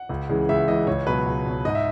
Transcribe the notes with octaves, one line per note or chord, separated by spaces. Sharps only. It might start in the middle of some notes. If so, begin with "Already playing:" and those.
Already playing: F#5
C#2
C#3 E3 G#3
C#2 E5
C#3 E3 G#3 D#5
C#2 C#5
B2 F#3 B4
C#2
B2 F#3
G#2 D#5
E5